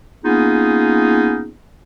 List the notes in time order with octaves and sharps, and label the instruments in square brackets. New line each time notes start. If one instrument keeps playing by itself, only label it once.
[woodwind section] A#3 B3 C#4 D#4 F4 G#4